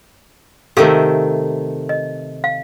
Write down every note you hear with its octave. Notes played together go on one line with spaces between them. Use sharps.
C3 D#3 A3 G4 A4 F5
D#5
F5